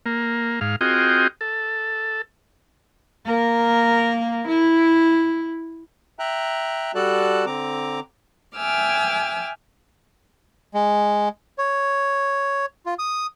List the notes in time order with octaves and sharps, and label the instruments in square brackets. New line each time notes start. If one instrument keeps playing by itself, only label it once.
[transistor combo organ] A#3
G#2 F5
C4 F4 F#4 G#4 D#5 G5
A4
[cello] A#3 A#4
E4
[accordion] E5 G5 A#5 F#6
G3 F#4 A4 D5 A5 F#6
D3 C4 A#5 D6
[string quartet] E5 G5 G#5 D6 E6 F6
[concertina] G#3
C#5
F4
D#6